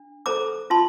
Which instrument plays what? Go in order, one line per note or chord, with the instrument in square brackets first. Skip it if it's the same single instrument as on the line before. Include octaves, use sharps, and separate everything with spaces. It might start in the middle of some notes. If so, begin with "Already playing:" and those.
Already playing: [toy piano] D4
A4 C5 A#5 D6
F4 A5 C6